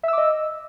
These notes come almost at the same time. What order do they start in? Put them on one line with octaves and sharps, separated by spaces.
E5 E6 D6 D#5